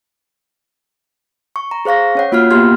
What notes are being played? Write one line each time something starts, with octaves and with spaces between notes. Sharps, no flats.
C#6
A#5
G#4 C5 F5 C#6 A#6
C#4 C#5 F#5
A#3 F4 F#4 F#5 F6
A#3 B3 G4 C6 F6 G#6